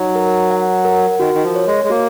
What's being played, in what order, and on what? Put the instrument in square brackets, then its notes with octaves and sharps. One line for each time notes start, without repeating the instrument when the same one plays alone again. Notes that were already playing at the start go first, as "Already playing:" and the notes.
Already playing: [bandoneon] F#3 [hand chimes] D#4
[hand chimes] A#4
F#5
A#4
[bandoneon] D#3 [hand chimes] F#4
[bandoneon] D#3
F3
[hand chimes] C#5
[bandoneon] G#3
G#3
[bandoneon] A#3 [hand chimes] F#4